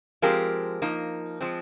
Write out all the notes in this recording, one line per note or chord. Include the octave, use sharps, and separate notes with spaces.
F3 G#3 C4 G4 A#4
F3 A#3 D#4
F3 G#3 C4